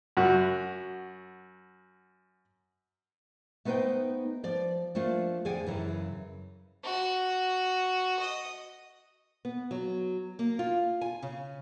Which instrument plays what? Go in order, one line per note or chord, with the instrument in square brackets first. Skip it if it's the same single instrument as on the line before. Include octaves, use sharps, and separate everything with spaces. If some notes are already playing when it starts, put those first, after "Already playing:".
[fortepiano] F#2 F#4
[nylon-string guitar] A3 B3 D#4 B4 C5 G5
F3 D5
F3 A3 A#3 D4 F4
F2 D3 G#4 D5 F#5 G#5
F#2 C#3 E3
[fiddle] F#4
D#5
[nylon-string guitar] B3
F#3
A#3
F4
G#5
C#3